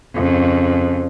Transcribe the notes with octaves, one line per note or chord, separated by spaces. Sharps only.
F2 C#3